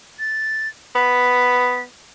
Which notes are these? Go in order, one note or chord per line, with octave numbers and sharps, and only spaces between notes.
A6
B3 B6